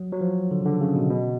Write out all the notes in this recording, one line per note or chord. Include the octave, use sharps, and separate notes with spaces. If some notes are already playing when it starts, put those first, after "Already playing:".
Already playing: F#3
F#3
F3
D3
C#3
D3
C#3
B2
B2